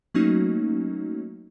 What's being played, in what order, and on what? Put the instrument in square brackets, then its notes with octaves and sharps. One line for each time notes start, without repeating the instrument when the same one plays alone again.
[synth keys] F#3 A3 A#3 C#4 D#4 F#4